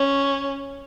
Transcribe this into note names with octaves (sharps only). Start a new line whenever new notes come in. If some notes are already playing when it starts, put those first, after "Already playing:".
Already playing: C#4